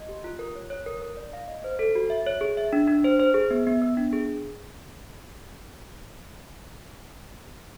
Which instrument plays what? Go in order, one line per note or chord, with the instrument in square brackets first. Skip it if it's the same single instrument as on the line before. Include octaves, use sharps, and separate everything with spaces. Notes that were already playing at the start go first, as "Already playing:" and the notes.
Already playing: [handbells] D#5
G4
F4
A#4
C#5
C#5
A#4
A#4
D5
F5
D#5
C5
A4
F#4
E5
C#5
G#4
E5
D4
D4
C5
C5
G#4
B3
B3
B3
D4
G#4